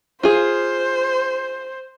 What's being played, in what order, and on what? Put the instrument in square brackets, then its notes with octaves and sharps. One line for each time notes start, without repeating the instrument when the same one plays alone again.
[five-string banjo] F4 G#4 [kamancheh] C5